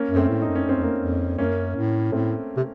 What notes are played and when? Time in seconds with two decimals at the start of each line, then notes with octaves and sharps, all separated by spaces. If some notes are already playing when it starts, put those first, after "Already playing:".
Already playing: A#3 C#4
0.11 F#2
0.16 A3 C4
0.29 A2
0.42 D#4
0.48 F#2
0.55 C#4
0.66 F#2 C4
0.76 F2
0.82 A#3 C#4
0.99 F2
1.38 F#2 A#3 C#4
1.76 A2
2.12 A2 A3 C4
2.57 C3